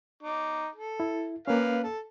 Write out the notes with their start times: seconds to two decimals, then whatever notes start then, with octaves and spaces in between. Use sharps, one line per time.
0.23 D#4 D6
0.75 A4
1.00 E4
1.48 A#3 C#4 B4 F5
1.84 A4